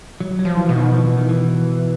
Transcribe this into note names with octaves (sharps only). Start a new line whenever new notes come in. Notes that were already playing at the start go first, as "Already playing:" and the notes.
F#3
F#3
F3
E3
B2
D#3
F3
E3
D#3
E3